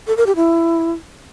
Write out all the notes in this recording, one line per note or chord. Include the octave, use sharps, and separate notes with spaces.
A4
A#4
G4
E4